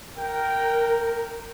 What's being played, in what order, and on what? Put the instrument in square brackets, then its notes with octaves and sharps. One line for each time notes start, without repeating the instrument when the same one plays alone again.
[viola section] A#4 [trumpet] G5